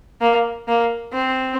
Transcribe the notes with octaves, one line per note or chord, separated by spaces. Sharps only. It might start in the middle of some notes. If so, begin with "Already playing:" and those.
A#3
A#3
C4